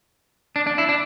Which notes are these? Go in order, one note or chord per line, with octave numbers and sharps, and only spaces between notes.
D4
D4
E4
D4